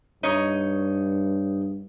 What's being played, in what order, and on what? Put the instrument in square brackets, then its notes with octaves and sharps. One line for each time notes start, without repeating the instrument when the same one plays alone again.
[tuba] G2 [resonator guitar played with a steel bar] D#4 C#5 D#5